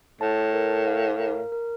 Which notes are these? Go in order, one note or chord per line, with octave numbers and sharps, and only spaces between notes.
A2 A5
A#4
F5
A#4
A#4